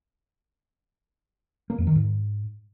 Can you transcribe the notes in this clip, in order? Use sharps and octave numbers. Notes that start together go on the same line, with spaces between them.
A#3
F2
D#3
G#2